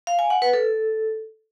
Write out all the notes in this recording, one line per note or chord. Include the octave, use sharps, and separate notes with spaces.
F5
G#5
F#5
B4
A4